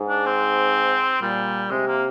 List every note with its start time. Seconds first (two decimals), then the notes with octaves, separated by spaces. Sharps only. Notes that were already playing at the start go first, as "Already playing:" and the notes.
Already playing: G#2
0.09 D4
0.26 C4
1.21 A#2 G3
1.71 C3 G#3
1.87 A#3